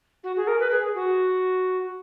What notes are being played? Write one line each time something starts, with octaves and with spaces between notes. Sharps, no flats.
F#4
G#4
A#4
B4
G#4
F#4